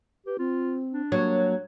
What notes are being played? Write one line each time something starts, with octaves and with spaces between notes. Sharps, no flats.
G4 B4
C4 F4
D4
F#3 A#3